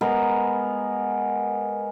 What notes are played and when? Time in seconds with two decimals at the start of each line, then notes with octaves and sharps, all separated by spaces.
0.01 G#3 B3 A#4